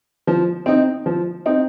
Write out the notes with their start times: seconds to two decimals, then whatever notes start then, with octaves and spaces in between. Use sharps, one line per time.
0.27 F3
0.66 C4 D#4
1.06 F3
1.46 C4 D#4